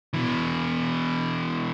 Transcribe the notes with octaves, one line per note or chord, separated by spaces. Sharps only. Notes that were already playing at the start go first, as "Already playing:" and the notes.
B2 E3